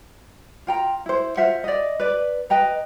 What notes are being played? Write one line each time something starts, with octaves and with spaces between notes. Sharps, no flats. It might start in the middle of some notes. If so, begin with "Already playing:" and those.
F4 G5 A#5
E4 C5
F4 C5 E5 F#5
D5 D#5
B4 D5
B4 D#5 G5 A#5